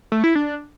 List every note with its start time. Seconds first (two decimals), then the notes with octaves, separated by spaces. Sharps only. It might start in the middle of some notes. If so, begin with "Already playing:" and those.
0.12 A3
0.24 E4
0.35 D4